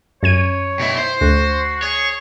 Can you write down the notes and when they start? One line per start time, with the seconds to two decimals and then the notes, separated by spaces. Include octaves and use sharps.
0.23 F#2 C#5 G#6 D#7
0.80 B2 E4
0.98 C5
1.21 D2 F#4
1.83 G#4 C#5